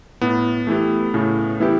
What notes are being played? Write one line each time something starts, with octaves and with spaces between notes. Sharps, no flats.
A2 B3
E3 A3 B3 E4 G4
A2 C#3
E3 B3 E4 G4